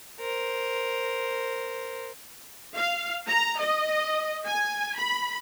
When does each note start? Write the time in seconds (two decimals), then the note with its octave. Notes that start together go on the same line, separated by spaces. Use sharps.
0.20 A#4 C5
2.77 F5
3.28 A#5
3.60 D#5
4.47 G#5
4.98 B5